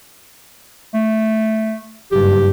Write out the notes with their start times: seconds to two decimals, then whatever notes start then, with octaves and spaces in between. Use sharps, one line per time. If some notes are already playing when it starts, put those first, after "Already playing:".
0.94 A3
2.12 F#1 G2 G4